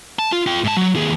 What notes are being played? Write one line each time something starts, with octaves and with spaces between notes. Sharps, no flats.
A5
F4
F4 G5
G#2 A5
F#3
D#2 G#4